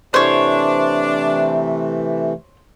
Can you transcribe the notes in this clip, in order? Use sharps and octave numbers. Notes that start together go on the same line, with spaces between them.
C3 E3 A3 D4 C5 C#5